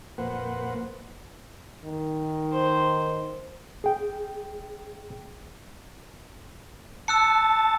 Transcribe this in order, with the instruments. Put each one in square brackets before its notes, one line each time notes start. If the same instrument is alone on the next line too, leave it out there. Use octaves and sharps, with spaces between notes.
[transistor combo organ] F2 A#2 A#3 B4 C5 F#5
[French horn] D#3
[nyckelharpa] C5
[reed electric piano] G#4 G5
[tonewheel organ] A5 A6 [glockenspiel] E6 F#6 C#7